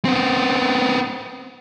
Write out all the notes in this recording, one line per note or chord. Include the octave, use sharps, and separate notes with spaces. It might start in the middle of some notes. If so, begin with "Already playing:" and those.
B3 C4